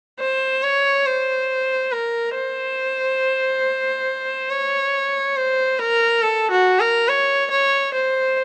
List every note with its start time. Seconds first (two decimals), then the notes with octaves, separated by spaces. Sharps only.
0.20 C5
0.63 C#5
1.07 C5
1.92 A#4
2.35 C5
4.50 C#5
5.37 C5
5.79 A#4
6.22 A4
6.51 F#4
6.80 A#4
7.08 C#5
7.51 C#5
7.94 C5